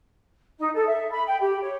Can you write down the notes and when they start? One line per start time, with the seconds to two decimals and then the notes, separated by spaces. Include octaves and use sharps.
0.58 D#4
0.75 A4
0.87 E5
1.11 B5
1.26 G5
1.41 G4
1.62 C#5